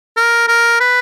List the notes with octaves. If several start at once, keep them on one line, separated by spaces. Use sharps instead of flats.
A#4
A#4
B4